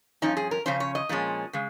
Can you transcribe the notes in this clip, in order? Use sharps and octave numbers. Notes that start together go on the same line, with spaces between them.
G2 F3 C#4 D#4
G#4
A#4
C#3 F3 C#4 C5
C#5
D#5
A#2 F3 G#3 C#4
C#3 G#3